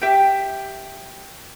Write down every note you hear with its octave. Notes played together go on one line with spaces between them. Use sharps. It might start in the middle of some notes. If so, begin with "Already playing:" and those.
G4 E5 G5